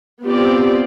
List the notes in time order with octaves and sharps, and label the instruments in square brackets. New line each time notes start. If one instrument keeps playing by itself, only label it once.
[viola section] B3 C4 F4 G4 D5